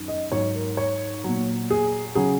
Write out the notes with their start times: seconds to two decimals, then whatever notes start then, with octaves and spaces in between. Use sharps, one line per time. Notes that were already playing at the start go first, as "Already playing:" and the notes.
Already playing: F#2 D#3
0.08 D#5
0.32 G#2 F#3 C#5
0.55 A#4
0.77 C#5
1.24 A#2 F#3
1.70 G#4
2.15 C#3 F#3 G#4